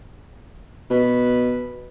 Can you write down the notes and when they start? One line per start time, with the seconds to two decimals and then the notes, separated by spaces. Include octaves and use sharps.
0.90 B2 B4